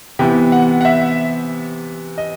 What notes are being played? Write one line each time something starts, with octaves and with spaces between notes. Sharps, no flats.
C3 E3 B3 G5
F#5
F#5
E5
D#5